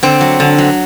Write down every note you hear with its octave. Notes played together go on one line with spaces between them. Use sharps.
D3 C4
F#3
D3
F#3